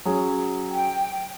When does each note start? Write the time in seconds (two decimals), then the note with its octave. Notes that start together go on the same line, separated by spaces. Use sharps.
0.05 F#3 C#4 G#4
0.70 G5